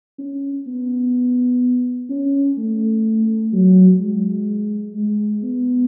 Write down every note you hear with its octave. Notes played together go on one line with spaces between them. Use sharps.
C#4
B3
C#4
A3
F#3
G#3
G#3
B3